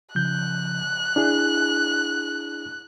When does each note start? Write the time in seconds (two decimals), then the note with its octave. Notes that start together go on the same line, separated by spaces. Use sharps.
0.15 C#3 F3 F#6 G6
1.16 D4 E4 G#4